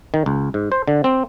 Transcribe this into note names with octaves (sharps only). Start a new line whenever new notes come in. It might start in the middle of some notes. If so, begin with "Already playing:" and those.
D#3
C#2
G#2
C5
D3
C4